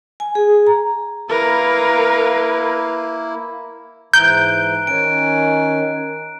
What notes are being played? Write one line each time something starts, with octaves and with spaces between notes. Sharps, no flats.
G#5
G#4
A#5
A#3 E4 A#4 B4 F5
G#2 E3 A#5 F#6 G6 D7
D#3 C#4 G#5 D7